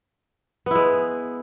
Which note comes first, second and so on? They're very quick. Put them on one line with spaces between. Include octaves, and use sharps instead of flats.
B3 E4 G#3